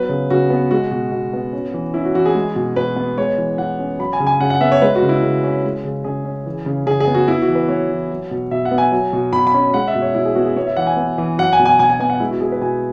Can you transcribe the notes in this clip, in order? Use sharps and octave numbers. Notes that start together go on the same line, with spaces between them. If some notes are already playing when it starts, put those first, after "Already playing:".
Already playing: F#3 B3 B4
C#3
C#3 F#4
B3
G#3 F#4
B2
B2
B3
C#4
E3
C#4 E4
F#4
E3 F#4
G#4
G#3
B2
B2 B4
B3
G#3 C#5
E3
E3 F#5
C#4
F#3 B5
G#5
C#3
G#5
C#3 F#5
F#5
B3 E5
C#5
G#3 B4
F#4
C#3
E4
C#3
C#4
G#3
C#3
C#3 G#4
C#4
E3
C#3
C#3 G#4
G#4
B3
F#4
B3 E4
F#4
E3
B4
B3 C#5
E3
F#3
B2
B2 E5
F#5
B3
G#5
F#3
B2
B2 B5
B5
C#4
G#3 F#5
E5
B2
C#5
B2 E4
G#4
B3 F#4
G#4
B3 C#5
E5
E3 F#5
G#5
B3
E3
F#3 F#5
G#5
B2
G#5
B2 G#5
G#5
B3 G#5
F#5
G#3 E4
F#4
B2 G#4
B4
B2 G#5